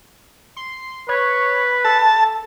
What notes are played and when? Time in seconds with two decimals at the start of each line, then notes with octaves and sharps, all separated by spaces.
0.57 C6
1.09 B4 C#5
1.85 A4 A5